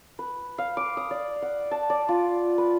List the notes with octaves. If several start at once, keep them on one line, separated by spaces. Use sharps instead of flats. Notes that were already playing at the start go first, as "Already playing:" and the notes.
B4
F5
D6
D#6
D5
F#5
A5
D5
F4
B4